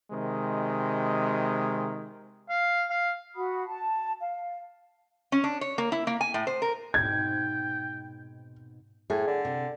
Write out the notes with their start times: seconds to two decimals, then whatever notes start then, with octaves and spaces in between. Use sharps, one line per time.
0.11 C3 D#3 G#3
2.49 F5
2.90 F5
3.35 F#4 F#5 B5 D#6
3.67 A5
4.20 F5
5.32 C#4
5.44 D4
5.61 C#5
5.78 A#3
5.92 E4
6.07 A#3
6.21 G#5
6.34 A2
6.47 C5
6.62 A#4
6.94 G#2 B2 C4 G5 G#6
9.10 A2 G#4
9.27 D3
9.45 C3